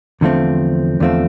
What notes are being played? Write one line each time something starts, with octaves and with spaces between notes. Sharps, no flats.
E2 D3 F3 A3 C4
E2 D3 F3 A3 C4